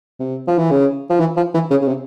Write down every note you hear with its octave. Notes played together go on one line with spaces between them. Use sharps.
C3
F3
E3
C#3
F3
E3
F3
E3
C#3
C#3
C3